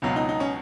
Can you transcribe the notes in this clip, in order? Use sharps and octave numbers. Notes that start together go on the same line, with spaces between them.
C#2 B2 F#3
F4
D#4
D#4
C#4